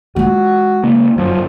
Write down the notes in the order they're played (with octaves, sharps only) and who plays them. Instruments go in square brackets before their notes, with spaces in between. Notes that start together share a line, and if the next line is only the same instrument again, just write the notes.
[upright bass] G#3 F4 [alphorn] F#4
[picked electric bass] C#3 A#3
[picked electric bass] G1 F#2 [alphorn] F3